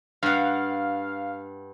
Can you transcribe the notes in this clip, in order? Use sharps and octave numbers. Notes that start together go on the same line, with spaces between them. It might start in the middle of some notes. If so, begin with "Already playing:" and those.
G2 F5 F#5